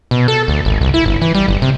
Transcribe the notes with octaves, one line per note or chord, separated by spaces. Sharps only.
B2
A4
D2
G#1
C2
E4
G1
E3
G3
G1
C3